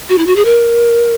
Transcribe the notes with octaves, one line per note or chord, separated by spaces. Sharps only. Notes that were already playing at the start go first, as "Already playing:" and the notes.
F#4
E4
F#4
G#4
A#4